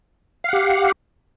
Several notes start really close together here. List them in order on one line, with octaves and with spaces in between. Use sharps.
F5 F#5 G4